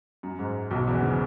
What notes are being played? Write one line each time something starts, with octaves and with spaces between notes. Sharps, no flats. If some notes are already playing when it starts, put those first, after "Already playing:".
F#2
G#2
B1 B2
E2 E3
C#3